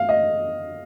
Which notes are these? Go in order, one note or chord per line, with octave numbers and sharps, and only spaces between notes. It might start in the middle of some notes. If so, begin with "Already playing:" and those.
Already playing: F5
D#5